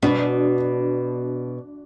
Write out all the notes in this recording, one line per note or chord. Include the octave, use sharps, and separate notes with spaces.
B2 D4 F#4